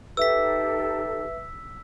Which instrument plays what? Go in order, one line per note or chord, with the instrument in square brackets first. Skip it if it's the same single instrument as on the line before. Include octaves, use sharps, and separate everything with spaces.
[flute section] D#4 G4 A4 [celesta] B4 E5 [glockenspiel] E6 B6